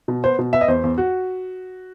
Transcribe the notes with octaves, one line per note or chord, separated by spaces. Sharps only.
B2
B3 C5
B2
B3 E5
D#5
E2 C5
E2
F#4